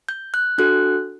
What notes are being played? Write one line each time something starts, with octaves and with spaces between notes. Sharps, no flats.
G6
F#6
D4 F#4 A4 F#6